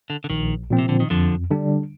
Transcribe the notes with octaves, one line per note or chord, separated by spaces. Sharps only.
D3
D3
A#1 D#3
A#2 F3 C4
C3
D3
D#3
F2 D3 F3
D3 G3 D4